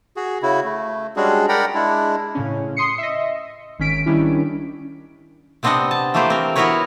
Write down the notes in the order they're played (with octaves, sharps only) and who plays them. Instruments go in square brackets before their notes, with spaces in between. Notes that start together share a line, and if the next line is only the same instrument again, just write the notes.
[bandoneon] F#4 G#4
C#3 E4 F#4
A3
G3 G#3 C#4 D4 F#4 G#4
A#4 D5 F#5 G5 A#5 B5
G#3 D4 E4
[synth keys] A2 C#3 C#4
C6 D#6 C7 C#7
D#5 E5
G#1 D#3 C#4 B6 D7
D#3 G3 C#4 D4 E4
[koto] C3 B3 C4 D4 D#5 F#5
A5
E3 A3 A#3 G4 B4 C5
C4 A#4
B3 E4 F#4 A#4 B4 C#5